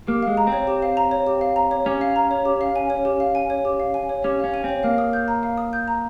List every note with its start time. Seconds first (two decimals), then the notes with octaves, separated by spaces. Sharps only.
0.07 A#3 G4
0.23 G#3 F5
0.37 A#5
0.47 C4
0.52 C#5
0.67 G4
0.82 F5
0.97 A#5
1.11 C#5
1.27 G4
1.41 F5
1.56 A#5
1.71 C#5
1.86 C#4 G4
2.01 F5
2.16 A#5
2.31 C#5
2.45 G4
2.61 F5
2.76 G#5
2.90 C#5
3.05 G4
3.20 F5
3.35 G#5
3.50 C#5
3.65 G4
3.80 F5
3.94 G#5
4.09 C#5
4.24 C#4 G4
4.39 C#4 F5
4.54 G#5
4.64 C4 C#5
4.83 A#3 F5
4.98 D#6
5.13 G6
5.28 A#5
5.43 F5
5.58 D#6
5.73 G6
5.88 A#5